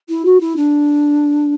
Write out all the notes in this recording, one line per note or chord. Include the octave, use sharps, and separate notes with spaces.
E4
F#4
E4
D4